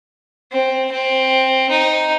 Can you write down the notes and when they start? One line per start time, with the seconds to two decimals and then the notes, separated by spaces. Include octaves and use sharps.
0.52 C4
0.91 C4
1.70 D#4